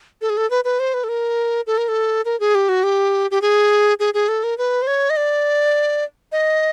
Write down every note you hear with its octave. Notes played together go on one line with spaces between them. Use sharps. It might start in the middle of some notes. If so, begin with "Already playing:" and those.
A4
G#4
A4
B4
B4
C5
B4
A4
A#4
A4
A#4
A4
A#4
G#4
G4
F#4
G4
G4
G#4
G#4
G#4
A4
A#4
B4
C5
C#5
D#5
D5
D#5